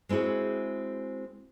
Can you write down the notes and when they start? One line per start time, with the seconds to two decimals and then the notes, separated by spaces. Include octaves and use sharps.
0.09 G#3 C4 E4 F#4 G#4